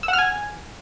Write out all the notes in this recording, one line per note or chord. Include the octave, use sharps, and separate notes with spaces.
E6
F#5
F6
G#5